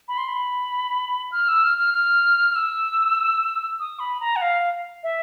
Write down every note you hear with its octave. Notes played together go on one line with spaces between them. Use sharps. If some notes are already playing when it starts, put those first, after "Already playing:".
B5
C6
B5
F6
E6
F6
F6
F6
F6
E6
D#6
B5
A#5
F#5
F5
E5